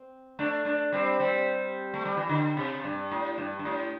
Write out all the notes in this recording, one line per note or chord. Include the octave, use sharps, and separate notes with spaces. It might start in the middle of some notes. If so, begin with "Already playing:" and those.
Already playing: C4
A3 D4
A3 D4
G3 C4
G3 C4
A3
G3
E3
D3
C3
G2
A2
G2
G2
A2